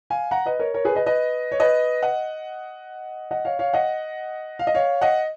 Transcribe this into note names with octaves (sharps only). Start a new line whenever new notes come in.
F5 G#5
F#5 A#5
B4 D#5
A#4 C#5
A#4 C#5
G#4 B4
B4 D#5
B4 D#5
C#5
B4 D#5
D#5 F#5
D#5 F#5
C#5 F5
C#5 F5
D#5 F#5
F5
D#5
C#5 F5
D#5 F#5